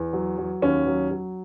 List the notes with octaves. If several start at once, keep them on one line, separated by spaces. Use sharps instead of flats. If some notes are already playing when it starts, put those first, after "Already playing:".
Already playing: E2
F#3
F#3
D#2 C#4
F#3
F#3